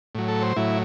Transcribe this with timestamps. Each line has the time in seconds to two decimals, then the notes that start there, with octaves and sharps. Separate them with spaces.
0.15 A2 F#3
0.28 A4
0.42 C5
0.56 A2 F#3 E4